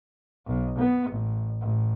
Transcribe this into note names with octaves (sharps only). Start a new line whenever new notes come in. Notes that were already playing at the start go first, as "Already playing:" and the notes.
B1
B3
A1
A1